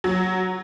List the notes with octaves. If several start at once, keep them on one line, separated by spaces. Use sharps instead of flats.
F#3